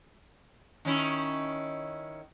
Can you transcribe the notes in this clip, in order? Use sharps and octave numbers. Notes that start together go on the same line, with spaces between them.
D#3 C#4 E4